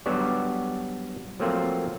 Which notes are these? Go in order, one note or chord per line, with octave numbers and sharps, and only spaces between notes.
F#3 G3 B3 D4 F#4 D5
F3 F#3 A3 A#3 C4 F4